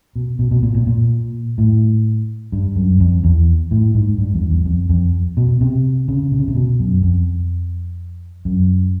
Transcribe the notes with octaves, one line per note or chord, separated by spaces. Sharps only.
B2
B2
B2
A#2
A#2
A#2
A2
G2
F#2
F2
E2
A2
G#2
G2
E2
E2
F2
F2
B2
C3
C#3
C3
C#3
C3
B2
F#2
F2
F#2